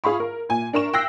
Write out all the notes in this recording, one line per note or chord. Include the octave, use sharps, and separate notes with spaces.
F4 G#4 F5 B5 C#6
A#4
A#2 G#5
D4 A#4 C#6 E7
G5 E6 F#6 A#6 C7